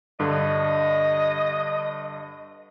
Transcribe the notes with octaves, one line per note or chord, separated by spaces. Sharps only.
G2 D3 D#5